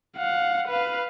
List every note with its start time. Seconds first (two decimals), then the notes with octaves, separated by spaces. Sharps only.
0.17 F5 F#5
0.68 B4 F5